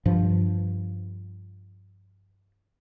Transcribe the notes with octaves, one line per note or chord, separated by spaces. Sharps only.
G2 F3